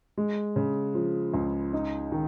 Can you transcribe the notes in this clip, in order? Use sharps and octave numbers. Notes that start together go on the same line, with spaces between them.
G#3
C#3
F3
C#2
D#4
D#3